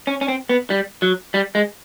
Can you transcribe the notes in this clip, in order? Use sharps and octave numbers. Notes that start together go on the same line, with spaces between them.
C#4
C#4
C4
B3
G3
F#3
G3
G#3